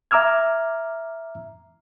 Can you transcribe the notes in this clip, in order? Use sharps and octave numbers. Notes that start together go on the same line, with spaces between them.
E5 A#5 D6 E6 F6 G#6